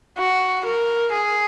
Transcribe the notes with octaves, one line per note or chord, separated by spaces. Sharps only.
F#4
A#4
G#4